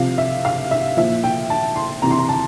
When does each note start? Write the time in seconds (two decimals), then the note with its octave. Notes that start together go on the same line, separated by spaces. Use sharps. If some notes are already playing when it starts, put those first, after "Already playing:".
Already playing: C3 F3 F5
0.18 E5
0.45 F5
0.71 E5
0.97 A#2 F3 E5
1.24 G5
1.50 A5
1.76 C6
2.02 C3 E3 A#5
2.11 C6
2.19 A#5
2.29 A5